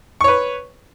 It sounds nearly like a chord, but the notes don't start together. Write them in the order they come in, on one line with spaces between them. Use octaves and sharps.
C#6 C#5 B4